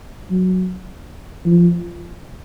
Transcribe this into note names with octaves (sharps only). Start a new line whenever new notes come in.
F#3
F3